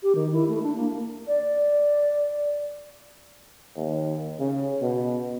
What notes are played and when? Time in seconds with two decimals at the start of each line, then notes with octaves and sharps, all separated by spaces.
0.03 G4
0.15 D#3
0.33 E4
0.49 A3
0.63 D4
0.75 A#3
1.27 D5
3.77 D#2
4.40 C#3
4.82 B2